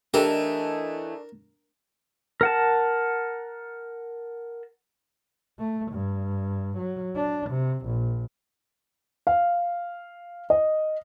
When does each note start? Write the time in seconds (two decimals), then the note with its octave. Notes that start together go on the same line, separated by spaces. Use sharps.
0.14 E3 A3 D4 D#4 G4 A4 A#4
2.41 A#4 F#5 A5
5.59 A3
5.92 G2
6.78 F#3
7.16 D4
7.50 C3
7.86 A#1
9.27 F5
10.50 D#5